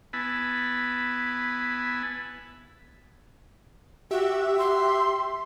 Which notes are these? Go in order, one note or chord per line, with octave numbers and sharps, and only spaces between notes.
B3 E4 G#5 A5 B5
F#4 G4 E5
C6